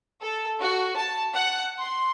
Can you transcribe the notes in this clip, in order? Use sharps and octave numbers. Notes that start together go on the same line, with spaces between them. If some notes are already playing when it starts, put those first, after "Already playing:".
A4
F#4
A5
F#5
C6